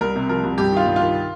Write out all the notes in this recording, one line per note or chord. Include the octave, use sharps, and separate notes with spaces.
C2 A#4
C3
F3 A#4
C2
G2 G4
D#3 F4
G2
F4
D#3